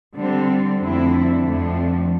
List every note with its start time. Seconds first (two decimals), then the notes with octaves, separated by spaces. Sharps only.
0.14 D3 G3 C4
0.79 F2 D3 A3 C4 E4
1.44 F2 D3 F3 A3 C4